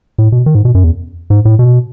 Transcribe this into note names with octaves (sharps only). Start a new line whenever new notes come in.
A2
B2
D#3
G#2
B2
F#2
E2
G#2
A2
B2